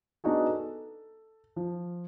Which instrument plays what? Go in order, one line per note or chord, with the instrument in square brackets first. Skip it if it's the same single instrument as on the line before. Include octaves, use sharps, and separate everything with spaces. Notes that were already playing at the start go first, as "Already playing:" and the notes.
[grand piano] B3 D4 D#4 F#4 G#4
A4
F3